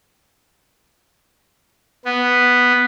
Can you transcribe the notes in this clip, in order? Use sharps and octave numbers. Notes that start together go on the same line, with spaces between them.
B3